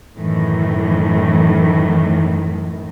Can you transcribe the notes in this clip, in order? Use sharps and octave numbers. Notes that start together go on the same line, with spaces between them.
F#2 A2 D#3 E3